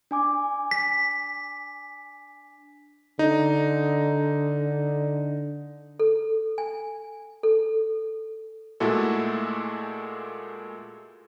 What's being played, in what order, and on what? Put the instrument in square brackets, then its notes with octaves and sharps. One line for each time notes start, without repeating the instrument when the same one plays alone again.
[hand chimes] D4 G#5 D6
[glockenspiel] B6
[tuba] D3 [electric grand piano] D#4
[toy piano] A4
G#5
A4
[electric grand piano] A#2 G#3 A3 E4 F#4 A4